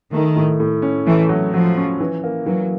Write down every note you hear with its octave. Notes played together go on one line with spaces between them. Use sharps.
D#3 A3
A2
A2
C#4
E3 A3
F#3
F3 F#3
C#4
E3
A#3
E3 F#3